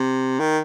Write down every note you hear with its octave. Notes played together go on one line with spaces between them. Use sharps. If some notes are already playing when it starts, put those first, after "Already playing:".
Already playing: C3
D#3